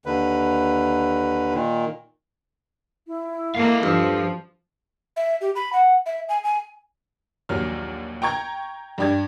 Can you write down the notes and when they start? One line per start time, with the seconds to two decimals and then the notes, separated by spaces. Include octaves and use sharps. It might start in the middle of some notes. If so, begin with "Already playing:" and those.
0.06 D#2 D3 B4
1.54 A#2 D#3
3.07 E4
3.55 A#3 A4 F5
3.83 G2 F3
5.17 E5
5.41 G4
5.56 B5
5.73 F#5
6.06 E5
6.29 G#5
6.44 G#5
7.49 A#1 D#2 F#3 F6
8.22 G5 A#5 C#6 G#6
8.98 G2 D4 G4 D6 G#6